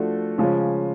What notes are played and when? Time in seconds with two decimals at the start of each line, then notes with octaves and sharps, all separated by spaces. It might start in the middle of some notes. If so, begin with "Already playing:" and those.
Already playing: F3 A3 D4 F#4
0.38 C#3 F3 G#3 C#4